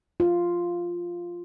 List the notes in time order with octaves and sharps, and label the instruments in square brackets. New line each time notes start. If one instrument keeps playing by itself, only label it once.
[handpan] F4